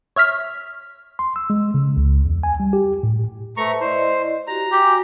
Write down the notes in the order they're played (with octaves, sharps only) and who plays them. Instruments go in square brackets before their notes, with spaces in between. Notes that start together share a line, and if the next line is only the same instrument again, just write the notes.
[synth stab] C#5 E5 F6 B6
[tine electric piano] C6
E6
G#3
C#3
C#2
E2
G#5
G3
G4
A2
[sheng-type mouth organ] A3 A#5 C#6 [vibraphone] B4 C5 E5
[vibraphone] E4 D5 D#5 [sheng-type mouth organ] C5
[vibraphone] F#4 G4 [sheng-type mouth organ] A#5
[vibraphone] F#4 G#5 [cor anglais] G4